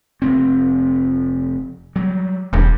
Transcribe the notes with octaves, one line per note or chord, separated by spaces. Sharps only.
F1 C4
F#3 G3
E1 G2